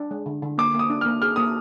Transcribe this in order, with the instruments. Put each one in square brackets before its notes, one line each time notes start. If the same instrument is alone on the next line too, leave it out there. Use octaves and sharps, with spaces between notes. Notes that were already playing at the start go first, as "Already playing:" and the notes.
Already playing: [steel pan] D4
G#3
D3
D3
[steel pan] A#3 [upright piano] D6
[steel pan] A#3 [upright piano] D#6
[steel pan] D4
[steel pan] A#3 [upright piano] F6
[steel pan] G#4 [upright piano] F6
[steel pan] A#3 [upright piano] D#6